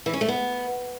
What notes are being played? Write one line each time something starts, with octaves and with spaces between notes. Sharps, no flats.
E3
C#4
A3
B3